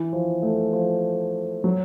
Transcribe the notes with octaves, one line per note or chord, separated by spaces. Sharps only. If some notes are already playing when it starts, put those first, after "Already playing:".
Already playing: E3
F3
A3
F3
F#3